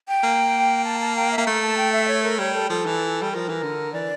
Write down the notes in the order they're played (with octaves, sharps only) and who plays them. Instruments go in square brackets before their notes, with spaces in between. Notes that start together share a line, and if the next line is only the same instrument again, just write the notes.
[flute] G5
[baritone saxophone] A#3
[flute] A5
A5
G5
E5
[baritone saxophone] A#3
A3
[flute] A5
G5
E5
C#5
A#4
[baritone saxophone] G3 [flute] C#5
[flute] A4
[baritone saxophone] F3 [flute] A4
[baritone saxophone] E3
G3
[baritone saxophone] F3 [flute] A#4
[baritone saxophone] E3
D3
[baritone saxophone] E3 [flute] D5